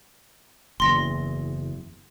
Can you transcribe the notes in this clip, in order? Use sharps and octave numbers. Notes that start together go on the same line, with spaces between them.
F#1 E2 C6 A#6